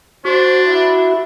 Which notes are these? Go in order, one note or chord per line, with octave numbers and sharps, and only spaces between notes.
D4 F#4 C5
E4